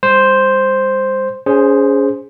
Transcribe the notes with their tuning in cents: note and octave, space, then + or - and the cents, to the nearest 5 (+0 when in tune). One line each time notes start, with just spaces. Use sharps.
G3 +30 C5 +0
C#4 +30 G#4 +0 C5 +0